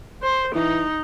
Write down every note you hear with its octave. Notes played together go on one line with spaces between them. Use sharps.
C5
E3 D#4